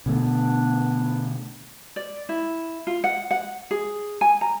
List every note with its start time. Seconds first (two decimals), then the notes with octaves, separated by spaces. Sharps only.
0.06 B2 D3 A3 B3 D4
1.96 D5
2.29 E4
2.87 F4
3.04 F#5
3.31 F#5
3.71 G#4
4.21 G#5
4.41 A#5